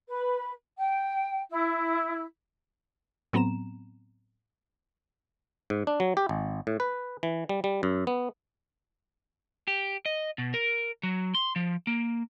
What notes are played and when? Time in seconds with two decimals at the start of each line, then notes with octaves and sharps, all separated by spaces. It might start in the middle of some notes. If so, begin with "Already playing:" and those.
0.08 B4
0.77 G5
1.50 E4
3.33 A2 F#3 B3 C4 A#5 E7
5.70 G#2
5.87 D4
6.00 F#3
6.17 G4
6.29 G#1
6.67 A2
6.80 B4
7.23 E3
7.49 G3
7.64 G3
7.83 F#2
8.07 B3
9.68 G4
10.06 D#5
10.38 B2
10.54 A#4
11.03 F#3
11.35 C6
11.56 F3
11.87 A#3